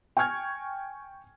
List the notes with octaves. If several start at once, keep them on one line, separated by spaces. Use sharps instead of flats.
G5 G#5 C#6 F6 G#6